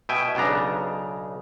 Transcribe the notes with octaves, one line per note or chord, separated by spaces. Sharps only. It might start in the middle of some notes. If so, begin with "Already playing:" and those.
B2 E5 G5 G#5
B1 C#3 B3 D4 A#5